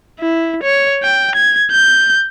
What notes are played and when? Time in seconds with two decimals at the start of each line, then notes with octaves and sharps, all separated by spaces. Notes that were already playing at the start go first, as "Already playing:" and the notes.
0.20 E4
0.63 C#5
1.03 G5
1.35 G#6
1.71 G6